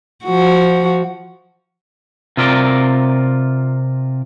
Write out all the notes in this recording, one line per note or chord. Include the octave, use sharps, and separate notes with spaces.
F3 F#4
C3 F4 A#4 D5